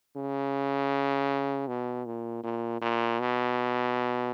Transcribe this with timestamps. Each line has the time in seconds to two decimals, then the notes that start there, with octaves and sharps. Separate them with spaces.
0.16 C#3
1.68 B2
2.06 A#2
2.44 A#2
2.81 A#2
3.20 B2